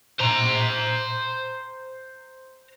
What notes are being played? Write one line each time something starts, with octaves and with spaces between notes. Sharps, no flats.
C5 A#5